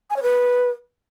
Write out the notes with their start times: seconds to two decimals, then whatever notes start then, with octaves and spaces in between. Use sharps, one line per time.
0.10 G#5
0.16 C#5
0.23 B4